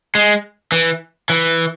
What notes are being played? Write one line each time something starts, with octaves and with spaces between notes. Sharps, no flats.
G#3
E3
E3